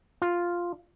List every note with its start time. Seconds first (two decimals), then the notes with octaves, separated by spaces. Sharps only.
0.22 F4